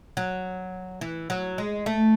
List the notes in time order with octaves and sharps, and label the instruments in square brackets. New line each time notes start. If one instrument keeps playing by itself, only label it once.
[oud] F#3
E3
F#3
G#3
A3